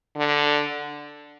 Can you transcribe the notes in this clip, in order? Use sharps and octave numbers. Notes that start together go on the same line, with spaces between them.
D3